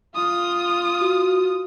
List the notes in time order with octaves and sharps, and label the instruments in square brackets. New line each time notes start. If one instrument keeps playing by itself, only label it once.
[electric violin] F4 D#6
[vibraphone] F#4